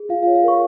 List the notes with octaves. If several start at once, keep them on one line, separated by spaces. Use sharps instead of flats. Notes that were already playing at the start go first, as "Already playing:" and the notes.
Already playing: G#4
F4 F5
F5
C#5
F5
A#4 C#6